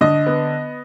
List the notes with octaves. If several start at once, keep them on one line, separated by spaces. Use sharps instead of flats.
D3 D#5
B3